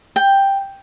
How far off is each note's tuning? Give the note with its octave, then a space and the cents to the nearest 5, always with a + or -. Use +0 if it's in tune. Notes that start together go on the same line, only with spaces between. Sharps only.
G5 +5